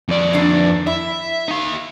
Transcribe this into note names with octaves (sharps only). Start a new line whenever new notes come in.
F2 D5
D3 D#3 D4
E4 E5
D#4 F5